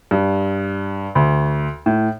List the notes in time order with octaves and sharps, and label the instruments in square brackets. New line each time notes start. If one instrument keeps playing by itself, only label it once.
[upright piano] G2
D2
A2